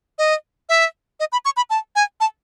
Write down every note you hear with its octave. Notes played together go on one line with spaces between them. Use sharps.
D#5
E5
D#5
B5
C#6
B5
A5
G#5
A5